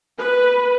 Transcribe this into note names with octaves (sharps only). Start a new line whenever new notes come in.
B4